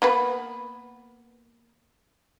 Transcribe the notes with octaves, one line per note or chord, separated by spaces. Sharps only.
A#3 B3 B4